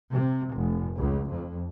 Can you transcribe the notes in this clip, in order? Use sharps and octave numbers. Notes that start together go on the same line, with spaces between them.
C3
F1
C#2
F2